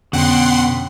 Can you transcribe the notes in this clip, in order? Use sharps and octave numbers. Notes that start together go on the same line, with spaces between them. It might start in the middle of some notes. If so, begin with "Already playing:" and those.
F2 B2 D3 C#4 F#5 G5 C6